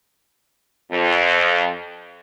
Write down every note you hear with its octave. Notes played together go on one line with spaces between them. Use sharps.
F2